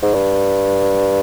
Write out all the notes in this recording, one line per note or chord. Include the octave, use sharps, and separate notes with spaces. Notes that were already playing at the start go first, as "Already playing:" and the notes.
G#2
G2